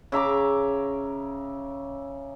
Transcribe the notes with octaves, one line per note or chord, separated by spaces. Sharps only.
C#3 E5 A#5 D6